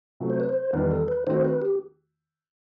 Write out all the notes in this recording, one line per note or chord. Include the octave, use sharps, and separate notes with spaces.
C3 F#3 A3
C5
B4
C5
E2 D#3 G3 B4
A4
B4
D#3 A3 C4 F#4 C5
B4
G4